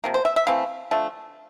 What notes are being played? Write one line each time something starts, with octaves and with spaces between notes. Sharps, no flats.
C3 F3 A#3
C5
E5
E5
E3 A3 C4 F5
D3 F3 A3